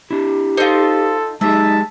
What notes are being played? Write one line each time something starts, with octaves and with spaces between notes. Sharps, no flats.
D4 E4 G4
D#4 F4 A4 C5 D#5 F5
G#3 D#4 G4 G#4 E5 A5